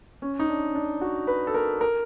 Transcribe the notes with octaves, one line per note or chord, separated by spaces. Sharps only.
C#4
D#4
D4
D4
F#4
B4
A4
A#4
A#4